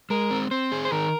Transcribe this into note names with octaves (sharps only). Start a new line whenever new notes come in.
G#3 A#4
C4
C4 C5
G#4
C5
D#3 A#4